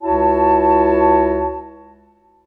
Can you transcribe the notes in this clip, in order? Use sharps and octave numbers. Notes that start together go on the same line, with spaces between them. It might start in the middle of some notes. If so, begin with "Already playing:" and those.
C#2 E4 F#4 C#5 A5